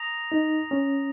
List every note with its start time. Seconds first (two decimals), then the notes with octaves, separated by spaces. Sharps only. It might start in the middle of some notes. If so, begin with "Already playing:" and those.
Already playing: A#5 D#6 A#6 F7
0.32 D#4
0.71 C#4